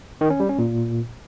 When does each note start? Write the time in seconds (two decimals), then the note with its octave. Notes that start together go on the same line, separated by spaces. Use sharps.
0.21 D#3
0.30 C#4
0.40 G3
0.49 C#4
0.59 A#2